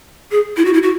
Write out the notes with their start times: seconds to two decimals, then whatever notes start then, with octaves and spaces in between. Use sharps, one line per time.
0.31 G#4
0.57 E4
0.65 F#4
0.73 E4
0.83 F#4